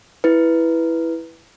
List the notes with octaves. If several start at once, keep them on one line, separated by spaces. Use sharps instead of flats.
E4 B4